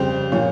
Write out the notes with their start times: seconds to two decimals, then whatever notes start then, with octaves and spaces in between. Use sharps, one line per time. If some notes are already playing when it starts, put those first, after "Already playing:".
Already playing: F2 C#3 G3 C5
0.32 A#2 F3 C#5